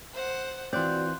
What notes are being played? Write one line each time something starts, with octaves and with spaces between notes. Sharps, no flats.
C5 F#5
E3 C4 F4 F#4 D5 C6 F#6 G6